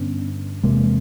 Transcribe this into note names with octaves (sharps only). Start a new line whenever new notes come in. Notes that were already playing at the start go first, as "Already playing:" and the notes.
Already playing: G2 D3 B3 C#4
E2 C3 G#3 A#3